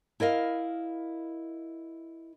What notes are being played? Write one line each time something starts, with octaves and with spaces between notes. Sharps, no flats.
E4 A#4 D#5 F5